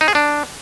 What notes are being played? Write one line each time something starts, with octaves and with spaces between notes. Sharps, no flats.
D#4
G#4
D4